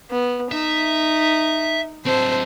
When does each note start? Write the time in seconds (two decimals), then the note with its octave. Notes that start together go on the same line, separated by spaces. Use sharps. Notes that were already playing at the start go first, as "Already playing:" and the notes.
0.10 B3
0.51 D#4 E5
2.05 F#3 C4 A4 C5